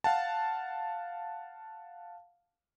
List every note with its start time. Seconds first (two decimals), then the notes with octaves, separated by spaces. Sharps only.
0.04 F5 F#5 A5